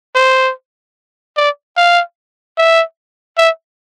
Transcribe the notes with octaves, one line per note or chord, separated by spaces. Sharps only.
C5
D5
F5
E5
E5